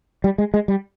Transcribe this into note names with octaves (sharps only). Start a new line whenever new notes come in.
G3
G#3
G#3
G3